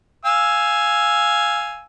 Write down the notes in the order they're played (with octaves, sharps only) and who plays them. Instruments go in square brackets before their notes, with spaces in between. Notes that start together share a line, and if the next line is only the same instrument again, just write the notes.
[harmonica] F5 G#5 E6